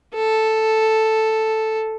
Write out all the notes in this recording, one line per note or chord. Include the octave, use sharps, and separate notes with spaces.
A4